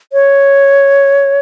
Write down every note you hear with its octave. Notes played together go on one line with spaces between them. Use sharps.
C#5